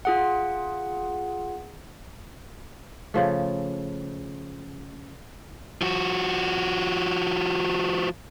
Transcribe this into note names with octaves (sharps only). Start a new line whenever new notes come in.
F4 G#4 F#5
C#3 F3 A3
F3 F#4